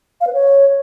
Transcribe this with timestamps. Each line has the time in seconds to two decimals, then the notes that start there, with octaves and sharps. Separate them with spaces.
0.21 F5
0.27 B4
0.33 C#5